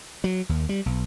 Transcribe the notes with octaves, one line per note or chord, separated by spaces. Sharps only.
F#3
D#2
G3
B1